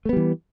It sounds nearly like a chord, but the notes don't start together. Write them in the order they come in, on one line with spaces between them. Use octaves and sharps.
A3 B3 G3 E3